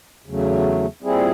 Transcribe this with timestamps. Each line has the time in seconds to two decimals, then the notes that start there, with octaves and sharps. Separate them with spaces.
0.26 E2 C#3 F#3 A3
1.01 A#2 G3 C4 E4 G#4